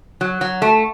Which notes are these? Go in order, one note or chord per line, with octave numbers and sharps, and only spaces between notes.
F#3
F#3
A3